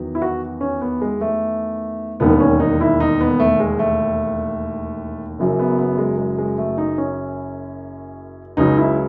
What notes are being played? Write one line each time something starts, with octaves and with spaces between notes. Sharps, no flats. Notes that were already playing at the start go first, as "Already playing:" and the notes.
Already playing: E2 D#3 F#3
E4
F#4
C#4
B3
G#3
A3
E1 D#2 D#3 B3
C#4
D#4
E4
D#4
B3
A3
G#3
A3
F#1 F#2 C#3 F#3
B3
B3
G#3
G#3
G#3
A3
D#4
C#4
C#2 C#3 F#3 D#4
E4